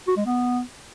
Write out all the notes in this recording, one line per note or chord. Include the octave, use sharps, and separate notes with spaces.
F#4
G#3
B3